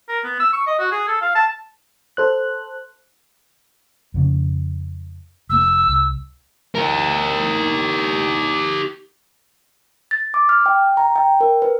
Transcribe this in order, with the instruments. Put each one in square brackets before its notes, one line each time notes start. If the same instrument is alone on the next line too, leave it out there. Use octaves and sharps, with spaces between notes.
[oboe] A#4
B3
E6
C#6
D#5
F#4
G#4
A4
F5
A5
[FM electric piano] A4 C5 F#6
[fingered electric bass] F2 C#3 C#4
[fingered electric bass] F1 A#3 [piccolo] E6
[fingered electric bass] C2
[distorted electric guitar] G4 A#4
[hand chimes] A6
D6
F6
G5
A#5
G5
A#4
B4